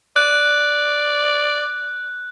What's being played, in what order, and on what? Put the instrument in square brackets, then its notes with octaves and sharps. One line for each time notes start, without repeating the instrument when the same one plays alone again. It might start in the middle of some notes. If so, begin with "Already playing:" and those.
[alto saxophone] D5 [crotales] F#6